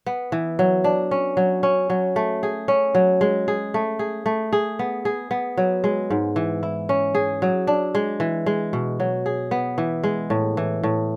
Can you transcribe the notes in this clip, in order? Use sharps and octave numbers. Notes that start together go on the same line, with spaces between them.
B3
E3
F#3
D4
C#4
F#3
C#4
F#3
A3
G#4
C#4
F#3
G#3
G#4
A3
G#4
A3
G#4
B3
G#4
B3
F#3
G#3
G#2
E3
E4
C#4
G#4
F#3
D4
G#3
E3
G#3
B2
F#3
G#4
B3
E3
G#3
A2
E3
A2